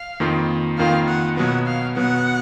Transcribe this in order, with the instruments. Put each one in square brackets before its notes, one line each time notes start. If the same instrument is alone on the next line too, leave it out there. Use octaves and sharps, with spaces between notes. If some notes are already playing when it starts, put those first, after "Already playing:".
Already playing: [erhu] F5
[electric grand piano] F2 D#3 A#3 F4
[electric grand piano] F2 D#3 A#3 F4 [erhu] F5
[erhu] F#5
[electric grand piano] B2 F#3 B3 [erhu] F#5
[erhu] F5
[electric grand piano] B2 F#3 B3 [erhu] F#5